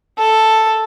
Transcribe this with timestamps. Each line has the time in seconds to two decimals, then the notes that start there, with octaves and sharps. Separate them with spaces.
0.18 A4